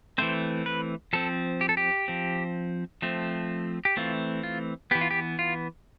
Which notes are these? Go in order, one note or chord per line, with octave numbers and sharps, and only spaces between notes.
E3 A3 C4 C5
B4
F3 C4 A4
G4
A4
G4
F3 C4
F3 A3 C4
G4
E3 A3 C4 F4
F4
E3 B3 G4
F4
G4
F4